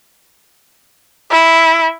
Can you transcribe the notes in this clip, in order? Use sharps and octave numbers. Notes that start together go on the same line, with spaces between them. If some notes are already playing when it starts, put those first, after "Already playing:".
E4